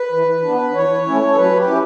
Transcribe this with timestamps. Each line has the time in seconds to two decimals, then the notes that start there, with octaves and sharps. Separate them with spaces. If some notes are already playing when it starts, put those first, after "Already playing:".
Already playing: B4
0.12 E3
0.43 B3 D4
0.74 E3 C#5
1.05 A3 C#4 E4
1.30 A4
1.36 F#3 B4
1.57 G4
1.68 C#4 E4